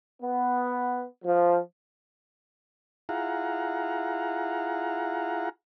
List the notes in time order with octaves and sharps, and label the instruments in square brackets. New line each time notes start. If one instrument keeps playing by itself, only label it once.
[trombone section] B3
F3
[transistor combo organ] E4 F4 G#4 F5 F#5 A#5